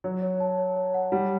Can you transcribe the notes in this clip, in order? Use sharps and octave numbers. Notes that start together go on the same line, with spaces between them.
F#3 C#5
C#5
A5
C#5
C#5
F#5
G3 F#5